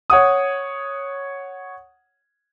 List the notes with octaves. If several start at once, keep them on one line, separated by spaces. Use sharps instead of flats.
C#5 F#5 D#6